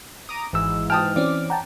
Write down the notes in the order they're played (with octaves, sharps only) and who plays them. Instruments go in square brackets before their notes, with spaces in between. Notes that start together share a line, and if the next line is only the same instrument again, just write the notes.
[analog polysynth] A#5 D6 D#6
[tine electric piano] G#1 E6 [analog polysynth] G#2 E3
[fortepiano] G5 A5 D#6 [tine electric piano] F6
[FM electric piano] E3 C4 C#4 [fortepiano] D5 [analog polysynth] D6
[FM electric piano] F#5 G5 A5 [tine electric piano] A#5